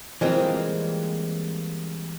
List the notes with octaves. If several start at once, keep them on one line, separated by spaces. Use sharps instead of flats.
E3 G3 G#3 A#3 C4 F4